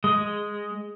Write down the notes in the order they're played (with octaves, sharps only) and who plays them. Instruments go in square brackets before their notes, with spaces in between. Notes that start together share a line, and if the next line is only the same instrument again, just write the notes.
[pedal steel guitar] G#3